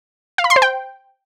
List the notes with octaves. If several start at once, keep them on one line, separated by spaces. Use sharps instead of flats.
F5
B5
C6
C5
G5